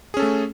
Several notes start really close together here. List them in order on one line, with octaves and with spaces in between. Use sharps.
G#4 C#4 A4 A3